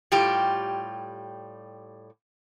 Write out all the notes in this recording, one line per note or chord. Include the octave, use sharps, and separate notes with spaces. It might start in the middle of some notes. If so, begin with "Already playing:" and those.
A2 G3 F4 G4